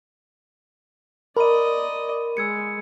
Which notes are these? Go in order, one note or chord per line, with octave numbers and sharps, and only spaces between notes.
A#4 D5 D#5 B5 C6 D#7
G#3 E6 G#6 C#7